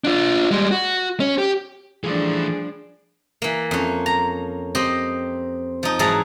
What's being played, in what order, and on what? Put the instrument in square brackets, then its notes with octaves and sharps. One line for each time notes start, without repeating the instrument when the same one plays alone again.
[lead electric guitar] D4 F4
G3 G#3
F#4
C#4
G4
[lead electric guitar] E3 A3 [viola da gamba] F3 G3 D4 [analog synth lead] G#4
[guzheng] E3 A#3
F2 C#4
A#5
C4 G4 D#5
F3 D#4
G#2 E3 F#3 G#4 A5 A#5